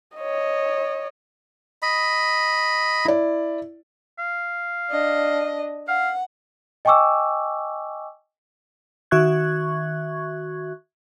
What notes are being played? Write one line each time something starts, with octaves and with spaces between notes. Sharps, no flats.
C#5 D#5
D#5 B5
E4 D5
F5
D4 D#5
F5 F#5
D#5 G5 G#5 C#6 D6 E6
D#3 F#4 E5 C#6 F#6 G#6